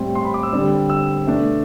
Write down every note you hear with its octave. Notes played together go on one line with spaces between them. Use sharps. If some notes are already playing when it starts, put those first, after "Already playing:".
Already playing: A2 G3 C4 C6
C6
B5
D6
E6
D3 G3 C4
E6
B2 A3 D4